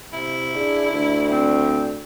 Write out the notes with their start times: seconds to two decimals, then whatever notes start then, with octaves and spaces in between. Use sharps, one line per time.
0.13 C3 E4
0.55 D4 G#4
0.92 D2 D4
1.31 C4